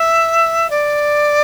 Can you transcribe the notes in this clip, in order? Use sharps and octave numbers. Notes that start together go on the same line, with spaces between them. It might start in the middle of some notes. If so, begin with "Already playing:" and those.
Already playing: E5
D5